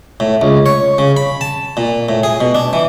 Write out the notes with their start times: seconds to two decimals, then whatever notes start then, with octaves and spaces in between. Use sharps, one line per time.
0.20 A2
0.41 C#2
0.66 C#5
0.98 C#3
1.17 B5
1.41 A5
1.77 A#2
2.09 A2
2.23 G#4
2.41 B2
2.55 D4
2.73 E3